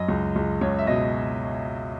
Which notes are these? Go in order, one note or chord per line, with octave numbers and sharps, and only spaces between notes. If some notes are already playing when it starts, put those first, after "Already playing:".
Already playing: F#2 D#5
C#2
C#2
C#2 C#5
E5
B2 D#5